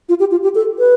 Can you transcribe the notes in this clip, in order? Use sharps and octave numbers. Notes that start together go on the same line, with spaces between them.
F4
G4
F4
G4
A4
B4